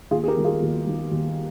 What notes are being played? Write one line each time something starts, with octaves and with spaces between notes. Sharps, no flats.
D#2 F4 G#4
G#4
G4 A#4
D#3 G3
F4 G#4
D#2
D#3 G3
D#2